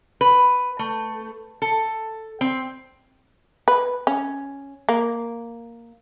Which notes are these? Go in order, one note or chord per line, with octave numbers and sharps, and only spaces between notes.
B4
A3
A4
C4
B4
C#4
A#3